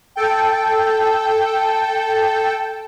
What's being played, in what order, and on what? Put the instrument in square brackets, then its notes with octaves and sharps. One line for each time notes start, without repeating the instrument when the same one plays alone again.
[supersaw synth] A4 G5